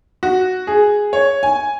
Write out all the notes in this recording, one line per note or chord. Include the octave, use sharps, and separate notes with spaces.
F#4
G#4
C#5
G#5